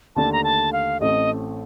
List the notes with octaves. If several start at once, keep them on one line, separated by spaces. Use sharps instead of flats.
D#2 D3 A3 A5
A#5
A5
F5
A1 A2 A3 C4 D#5